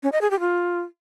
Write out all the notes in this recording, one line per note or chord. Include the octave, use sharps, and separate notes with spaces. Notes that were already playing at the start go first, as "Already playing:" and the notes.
C#4
D#5
G#4
G4
F4